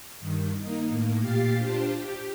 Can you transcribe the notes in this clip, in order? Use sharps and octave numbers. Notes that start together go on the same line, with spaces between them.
G2 D#3
A#3 D#4
A2 A#3
A#2 G4 F5 A6 C7
D4 F4 G4 C5 A5
G4